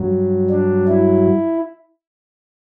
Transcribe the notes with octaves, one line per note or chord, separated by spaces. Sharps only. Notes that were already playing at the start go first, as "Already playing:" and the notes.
Already playing: G2 F#3
D4
E4